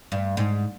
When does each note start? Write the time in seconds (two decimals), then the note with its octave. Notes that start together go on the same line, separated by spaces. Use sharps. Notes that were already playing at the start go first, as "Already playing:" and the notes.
0.12 G2
0.37 G#2